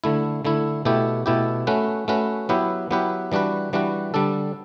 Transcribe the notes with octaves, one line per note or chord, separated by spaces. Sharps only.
D3 A3 E4
D3 A3 E4
B2 A3 E4 G4
B2 A3 E4 G4
A3 C#4 F#4 B4
A3 C#4 F#4 B4
F#3 B3 E4 G4 B4
F#3 B3 E4 G4 B4
E3 G3 D4 F#4 B4
E3 G3 D4 F#4 B4
D3 G3 D4 A4